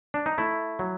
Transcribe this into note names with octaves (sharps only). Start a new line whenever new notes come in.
D4
D#4
A3 E4
F#3